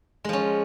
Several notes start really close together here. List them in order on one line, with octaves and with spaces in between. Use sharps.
G#3 F3 C#4